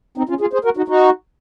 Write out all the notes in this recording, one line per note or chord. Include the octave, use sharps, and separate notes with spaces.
C4 D#4
C#4 F4
F4 G#4
G#4 C5
F#4 A#4
D#4 F#4
D#4 F#4